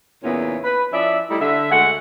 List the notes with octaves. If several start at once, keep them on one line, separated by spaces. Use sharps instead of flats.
E2 A#2 C#3 B3 C#4 D#4
B4
F3 C#4 E4 D5 E5
G3 A3 D#4 E4
D3 E5
D2 G#3 A3 F#5